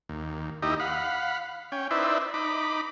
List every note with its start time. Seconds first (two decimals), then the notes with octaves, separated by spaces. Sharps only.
0.09 D#2
0.63 D#2 D#4 E4 G4 D#5
0.80 F5 F#5 B5
1.72 C#4 G5
1.91 D#4 E4 B4 C5 D5 E5
2.34 D#4 B5 D6